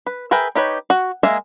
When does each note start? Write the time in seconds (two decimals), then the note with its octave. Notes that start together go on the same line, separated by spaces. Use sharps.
0.06 B4
0.31 G#4 A#4 B4 E5 G5
0.55 D#4 G4 B4 C#5
0.90 F#4
1.23 G#3 A#3 G#4 E5 A#5